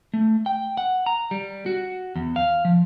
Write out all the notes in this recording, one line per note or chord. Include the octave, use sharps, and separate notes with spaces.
A3
G5
F#5
A#5
G3
F#4
E2
F5
F3